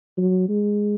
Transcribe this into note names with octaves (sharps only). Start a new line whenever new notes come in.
F#3
G#3